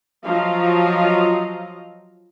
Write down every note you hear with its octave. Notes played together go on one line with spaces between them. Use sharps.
F3 F#3 F4 D#5 F5 A#5